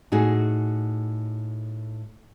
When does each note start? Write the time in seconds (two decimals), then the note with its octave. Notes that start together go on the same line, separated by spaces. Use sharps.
0.12 A2 D#4 F#4 G#4